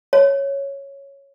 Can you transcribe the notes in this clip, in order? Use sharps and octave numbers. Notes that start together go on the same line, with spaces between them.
C#5